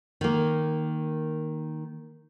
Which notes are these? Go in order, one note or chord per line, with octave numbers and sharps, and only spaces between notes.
D#3 A#3